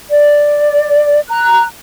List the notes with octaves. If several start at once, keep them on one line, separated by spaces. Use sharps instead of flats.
D5
A#5 F#6